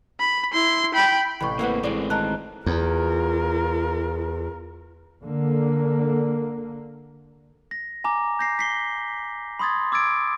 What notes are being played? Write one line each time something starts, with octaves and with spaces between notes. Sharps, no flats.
B5
E4 C6
G5 B5
A1 C3 E3 B5 C#6
A3 A#3 C4 E4 F#4 B4
E3 G#3 C4 E4 D5
D#3 A#4 D#5 A5 F#6
E2 F4 A#4
D3 A#3
A#6
G#5 A#5 D6
G6 A#6 C7
B6 C7 G7
B5 C6 D#6 G#6 A6
D6 E6 G#6 A6 D7